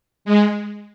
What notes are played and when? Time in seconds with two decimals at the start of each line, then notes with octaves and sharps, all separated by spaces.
0.25 G#3